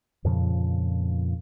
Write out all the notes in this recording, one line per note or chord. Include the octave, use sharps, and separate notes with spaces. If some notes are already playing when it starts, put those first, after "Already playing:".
F2 A#2 C#3 F3